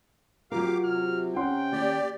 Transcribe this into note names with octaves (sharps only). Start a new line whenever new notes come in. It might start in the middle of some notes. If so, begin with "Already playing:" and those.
F#3 F4 G4 A#4 F5 D6
C3 F6
C#4 F#5 G5 C6
D#2 G4 D5